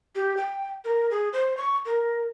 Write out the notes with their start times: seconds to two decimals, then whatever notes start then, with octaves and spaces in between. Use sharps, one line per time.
0.15 G4
0.37 G5
0.85 A#4
1.11 G#4
1.33 C5
1.57 C#6
1.86 A#4